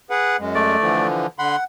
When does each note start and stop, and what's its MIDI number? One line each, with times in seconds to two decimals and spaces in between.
0.10 0.36 68
0.10 0.36 71
0.10 0.36 78
0.39 0.76 42
0.39 0.76 56
0.55 1.07 57
0.55 1.07 74
0.81 1.26 50
0.81 1.26 52
0.81 1.26 53
1.39 1.56 50
1.39 1.64 78
1.39 1.56 83
1.39 1.56 84